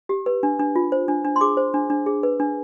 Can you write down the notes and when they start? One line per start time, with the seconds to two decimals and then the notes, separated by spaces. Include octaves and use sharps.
0.09 G4
0.26 B4
0.43 D4
0.59 D4
0.76 F4
0.92 C5
1.08 D4
1.25 D4
1.36 C6
1.41 G#4 D6
1.57 C5
1.74 D4
1.90 D4
2.06 G#4
2.23 B4
2.40 D4